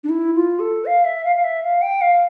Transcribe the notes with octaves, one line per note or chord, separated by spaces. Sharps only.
D4
E4
F4
A4
F5
E5
F5
F5
E5
F5
G5
F5